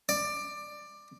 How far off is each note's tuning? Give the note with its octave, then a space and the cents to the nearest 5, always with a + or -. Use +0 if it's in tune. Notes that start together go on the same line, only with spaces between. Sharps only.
D5 +15